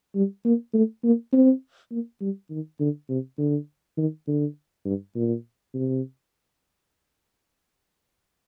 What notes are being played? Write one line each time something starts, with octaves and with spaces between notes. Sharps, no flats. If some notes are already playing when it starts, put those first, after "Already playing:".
G3
A#3
A3
A#3
C4
A#3
G3
D#3
D3
C3
D3
D#3
D3
G2
A#2
C3